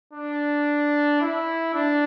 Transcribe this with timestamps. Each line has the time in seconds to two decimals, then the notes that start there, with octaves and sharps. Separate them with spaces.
0.13 D4
1.21 E4
1.74 D4